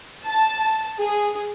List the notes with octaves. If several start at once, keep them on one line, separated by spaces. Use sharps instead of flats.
A5
G#4